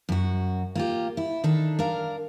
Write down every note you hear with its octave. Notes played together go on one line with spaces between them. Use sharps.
F#2 F#4
A#3 F4 G4
E4
D#3 D4 A4
D4 A#4 F5